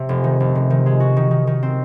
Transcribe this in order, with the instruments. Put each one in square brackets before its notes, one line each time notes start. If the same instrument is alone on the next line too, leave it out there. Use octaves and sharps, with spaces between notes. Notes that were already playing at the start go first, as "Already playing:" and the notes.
Already playing: [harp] C3
F1
D#3
F1
C3
D#3
G#3
F#4
D#3
D#3
D#3
C4